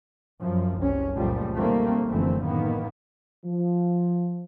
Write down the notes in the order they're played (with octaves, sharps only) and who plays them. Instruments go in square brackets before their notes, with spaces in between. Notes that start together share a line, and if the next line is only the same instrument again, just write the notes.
[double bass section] F#2 F3
F#1 C2 C#4
C#2 A#2 F3 G3 A3
B2 D#3 G3 A3 A#3 C4
F1 F#2 D3 E3 A3 C4
A1 D#3 A#3 B3
[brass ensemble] F3